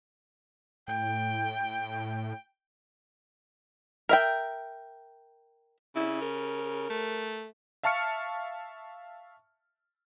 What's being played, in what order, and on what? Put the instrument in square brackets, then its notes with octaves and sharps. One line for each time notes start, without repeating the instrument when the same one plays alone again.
[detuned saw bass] A2 [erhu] G5
[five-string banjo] A#4 E5 G5
[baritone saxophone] C#3 [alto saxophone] E4
[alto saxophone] A#4
[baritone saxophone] A3
[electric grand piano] E5 F5 A5 C#6 F6 C#7